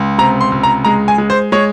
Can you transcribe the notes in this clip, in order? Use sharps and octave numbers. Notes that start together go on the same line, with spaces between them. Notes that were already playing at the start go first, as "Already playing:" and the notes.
Already playing: C#2
C3 A#5
C6
C#2
A#5
G#3 A#5
G#5
G#3
C5
G#3 C#5